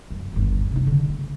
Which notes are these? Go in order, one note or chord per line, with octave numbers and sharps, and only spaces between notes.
F#2
G1 D#2
C3 D#4
D3
A#3